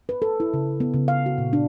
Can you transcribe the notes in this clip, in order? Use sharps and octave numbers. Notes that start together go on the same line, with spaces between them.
B4
A4
E4
C#3
B3
C#3
F5
F#4
A#2
D4